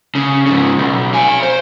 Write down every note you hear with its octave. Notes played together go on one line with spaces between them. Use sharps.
C#3
G#2 C#3
B1
F5 G#5
C5